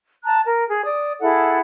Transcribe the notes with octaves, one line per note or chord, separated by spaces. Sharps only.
A5 A#5 F#6
A#4
G#4
D5 D#6
E4 G#4 A4 F#5